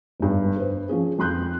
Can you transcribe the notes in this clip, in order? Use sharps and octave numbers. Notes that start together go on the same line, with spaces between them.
G1 G2
B4 C5
F3 C#4 G#4
F2 C6 F#6 G6